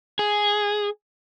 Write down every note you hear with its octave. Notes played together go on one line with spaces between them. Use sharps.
G#4